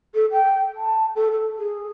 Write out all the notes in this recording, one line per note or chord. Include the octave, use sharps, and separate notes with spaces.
A4
G5
A5
A4
A4
G#4